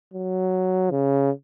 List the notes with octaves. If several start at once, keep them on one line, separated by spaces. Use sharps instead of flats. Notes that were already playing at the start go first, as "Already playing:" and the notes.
F#3
C#3